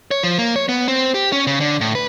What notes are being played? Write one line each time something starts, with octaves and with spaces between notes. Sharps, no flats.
C#5
F3
A#3
C#5
B3
C4
G4
C#4
C#3
D3
A2
B4